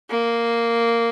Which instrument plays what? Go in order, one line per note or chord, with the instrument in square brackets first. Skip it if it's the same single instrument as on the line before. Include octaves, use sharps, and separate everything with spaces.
[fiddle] A#3